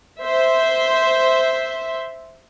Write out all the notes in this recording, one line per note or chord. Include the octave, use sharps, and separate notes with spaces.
C5 E5